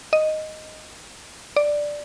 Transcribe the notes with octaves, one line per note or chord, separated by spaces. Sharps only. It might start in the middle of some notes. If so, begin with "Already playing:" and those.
D#5
D5